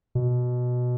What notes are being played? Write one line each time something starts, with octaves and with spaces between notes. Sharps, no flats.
B2